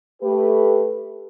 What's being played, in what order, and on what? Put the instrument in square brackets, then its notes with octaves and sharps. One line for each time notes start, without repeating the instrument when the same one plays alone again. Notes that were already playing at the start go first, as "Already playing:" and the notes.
[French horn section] A3 G4 B4